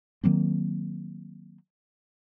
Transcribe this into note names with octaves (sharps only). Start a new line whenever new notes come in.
D#3 F#3 A#3 C4